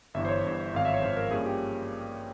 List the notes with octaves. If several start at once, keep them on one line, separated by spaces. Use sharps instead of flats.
G1 G2 E3 E5
C5
C#5
G1 G2 E3
G#1 G#2 F3 F5
E5
C#5
G#1 G#2 F3 C5
A#4
G2 F3 A#3 C#4 G#4
G4